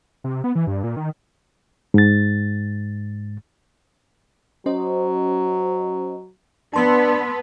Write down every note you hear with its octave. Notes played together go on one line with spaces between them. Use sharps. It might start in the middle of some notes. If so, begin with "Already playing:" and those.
C3
B3
E3
G2
A#2
D#3
G#2 A6
F#3 C#4 C5 D#5
B3 D4 B4 A5 C6 E6